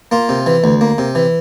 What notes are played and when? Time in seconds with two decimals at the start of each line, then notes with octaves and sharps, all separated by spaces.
0.12 A#3 F4
0.29 C3
0.46 E3
0.64 D2
0.81 A#3
0.98 C3
1.15 E3